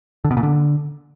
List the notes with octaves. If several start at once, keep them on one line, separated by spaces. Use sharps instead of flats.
D3
B2
A#2
D3